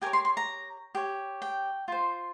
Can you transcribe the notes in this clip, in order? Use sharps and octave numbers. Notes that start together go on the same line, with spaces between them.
G4 A#4 C#5 G#5
C6
C6
A#5
G4 C#5
G5
F4 C5